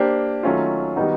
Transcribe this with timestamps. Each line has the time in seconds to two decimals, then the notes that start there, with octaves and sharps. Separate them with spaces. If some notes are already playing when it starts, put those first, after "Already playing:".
Already playing: A#3 D4 G4 C5
0.43 D#3 F#3 A3 C#4 F4
0.96 D#3 G3 B3 D#4 F#4